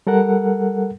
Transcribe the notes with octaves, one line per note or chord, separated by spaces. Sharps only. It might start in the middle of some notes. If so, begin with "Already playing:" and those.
G3 A4 A#4 F#5